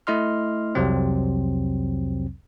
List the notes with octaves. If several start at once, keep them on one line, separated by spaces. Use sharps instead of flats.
A3 E4 D#5 C6 F6
C2 F2 C3 F#3 C4